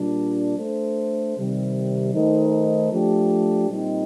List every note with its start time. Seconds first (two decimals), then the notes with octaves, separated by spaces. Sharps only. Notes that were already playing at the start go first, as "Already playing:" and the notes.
Already playing: A#2 G3 D4
0.57 A3 D4 A4 C5
1.36 C3 D#3 G3 C4
2.13 D#3 A3 D#4 A4 C5
2.91 F3 A3 D4 G4
3.69 A#2 G3 C4 D#4